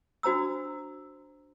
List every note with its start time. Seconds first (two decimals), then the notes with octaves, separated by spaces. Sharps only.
0.23 D4 F#4 C5 A#5 E6